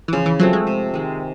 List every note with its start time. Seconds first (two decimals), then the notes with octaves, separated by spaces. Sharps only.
0.08 E3
0.13 C#3 F3
0.26 E3
0.39 F3 F#3 A3 C4
0.53 G#3
0.67 C3
0.94 D#3 G#3